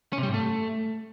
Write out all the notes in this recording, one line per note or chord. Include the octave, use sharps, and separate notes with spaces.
C#4
C3
G3
G#2
A3